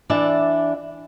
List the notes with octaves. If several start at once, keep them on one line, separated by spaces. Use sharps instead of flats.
E3 D4 D5 E5